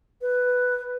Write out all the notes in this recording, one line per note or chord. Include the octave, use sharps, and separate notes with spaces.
B4